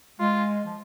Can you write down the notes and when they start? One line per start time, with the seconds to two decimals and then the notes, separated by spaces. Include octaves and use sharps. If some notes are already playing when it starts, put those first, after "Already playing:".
0.20 G#3 F4
0.65 F3